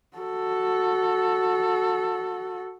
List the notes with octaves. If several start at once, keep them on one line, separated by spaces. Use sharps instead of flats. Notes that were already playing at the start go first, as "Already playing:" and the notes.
F#4 A4